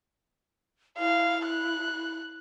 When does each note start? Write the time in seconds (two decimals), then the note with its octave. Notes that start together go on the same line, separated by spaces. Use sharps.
0.99 E4 F5
1.45 F#6